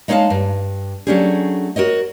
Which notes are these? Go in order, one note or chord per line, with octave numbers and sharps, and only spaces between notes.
G#3 D#4 C#5 D#5 F5 A5
G2
F#3 A3 C#4 D4 G4 G#4
F#4 A#4 C#5 D#5